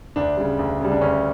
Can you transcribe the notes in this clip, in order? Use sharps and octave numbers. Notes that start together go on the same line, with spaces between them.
D2 D4
C#3 G3
D2
C#3 G3
D4
D2 C#4